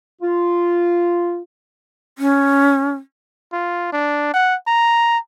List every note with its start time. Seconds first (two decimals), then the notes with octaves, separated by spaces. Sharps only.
0.22 F4
2.18 C#4
3.53 F4
3.93 D4
4.34 F#5
4.67 A#5